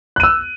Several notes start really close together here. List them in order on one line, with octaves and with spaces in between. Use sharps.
F#6 D#7 E6